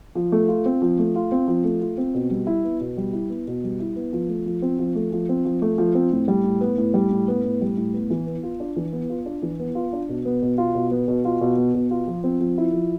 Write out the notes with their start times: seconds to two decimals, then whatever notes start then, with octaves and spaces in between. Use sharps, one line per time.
0.15 F3
0.32 A3
0.48 F4
0.66 C4
0.82 F3
0.99 A3
1.16 F4
1.32 C4
1.48 F3
1.64 A3
1.81 F4
1.98 C4
2.14 B2
2.31 G3
2.47 E4
2.64 B3
2.81 B2
2.97 G3
3.13 E4
3.30 B3
3.47 B2
3.64 G3
3.80 E4
3.96 B3
4.13 F3
4.29 A3
4.46 F3
4.62 C4
4.79 F3
4.95 A3
5.12 F3
5.29 C4
5.45 F3
5.62 A3
5.78 F3
5.95 C4
6.12 A2
6.28 G3
6.44 A2
6.61 B3
6.78 A2
6.94 G3
7.11 A2
7.28 B3
7.44 A2
7.61 G3
7.78 A2
7.94 B3
8.10 E3
8.27 B3
8.43 F4
8.60 D4
8.76 E3
8.93 B3
9.10 F4
9.26 D4
9.42 E3
9.60 B3
9.75 F4
9.93 D4
10.09 B2
10.25 B3
10.42 B2
10.58 F4
10.75 B2
10.91 B3
11.08 B2
11.25 F4
11.41 B2
11.57 B3
11.75 B2
11.91 F4
12.07 F3
12.24 C4
12.40 F3
12.58 E4
12.73 F3